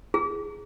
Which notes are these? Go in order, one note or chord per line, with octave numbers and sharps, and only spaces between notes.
G#4